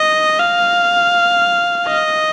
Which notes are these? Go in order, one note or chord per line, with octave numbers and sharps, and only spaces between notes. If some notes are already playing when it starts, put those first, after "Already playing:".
Already playing: D#5
F5
D#5